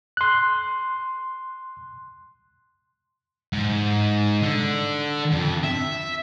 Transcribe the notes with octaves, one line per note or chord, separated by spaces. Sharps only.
C6 F#6
G#2
D3
F2
E5